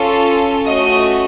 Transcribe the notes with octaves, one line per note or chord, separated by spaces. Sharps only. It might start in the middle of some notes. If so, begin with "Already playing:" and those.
Already playing: C#4 F4 A4
A3 C#4 F#4 D#5